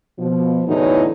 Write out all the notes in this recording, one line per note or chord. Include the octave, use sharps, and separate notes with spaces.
B2 F3
E2 A2 D3 E3 F#3 D#4